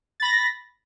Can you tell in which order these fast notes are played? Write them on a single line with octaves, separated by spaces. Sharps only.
A6 B5 A#6